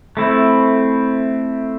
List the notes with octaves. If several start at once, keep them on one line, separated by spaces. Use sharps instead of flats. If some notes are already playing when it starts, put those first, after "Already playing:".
A3 C4 E4